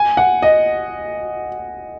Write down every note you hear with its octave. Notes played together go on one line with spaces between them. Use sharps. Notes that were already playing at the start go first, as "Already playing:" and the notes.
Already playing: G#5
F#5
D#5